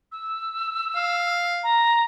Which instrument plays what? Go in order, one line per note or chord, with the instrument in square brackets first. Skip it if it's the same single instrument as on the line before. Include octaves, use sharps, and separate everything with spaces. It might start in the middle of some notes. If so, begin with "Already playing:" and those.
[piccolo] E6
[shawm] F5
[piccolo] A#5